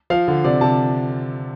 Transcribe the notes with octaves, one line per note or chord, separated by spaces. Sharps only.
F3 F5
D3
C3 D5
C3 A5